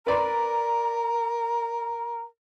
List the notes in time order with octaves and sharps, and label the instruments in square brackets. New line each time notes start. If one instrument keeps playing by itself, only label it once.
[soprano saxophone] A#4 [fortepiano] B4 D5 C6 [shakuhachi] A#5